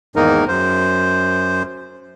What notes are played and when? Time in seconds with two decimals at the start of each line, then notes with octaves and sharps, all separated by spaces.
0.16 E2 G#2 D#3 A#3 D#4 A#4
0.48 F#2 C5